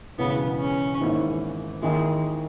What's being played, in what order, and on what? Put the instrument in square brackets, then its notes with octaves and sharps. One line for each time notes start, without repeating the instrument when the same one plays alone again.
[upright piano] E1 E2 C#3 [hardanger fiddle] B3
[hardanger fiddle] C#4
[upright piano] G#1 G#2 E3 A#3 E4
[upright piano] D#2 D#3 A#3 E4 [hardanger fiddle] G#3